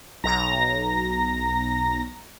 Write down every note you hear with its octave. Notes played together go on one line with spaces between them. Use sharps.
B1 A#5 A#6